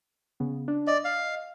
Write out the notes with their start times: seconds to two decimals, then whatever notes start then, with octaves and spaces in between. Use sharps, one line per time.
0.40 C#3 B3
0.68 D4
0.87 D5 D#5
1.05 F5